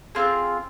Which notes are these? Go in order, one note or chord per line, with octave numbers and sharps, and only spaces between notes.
C4 F4 G#4